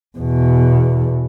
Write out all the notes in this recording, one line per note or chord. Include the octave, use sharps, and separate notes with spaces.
E2 B2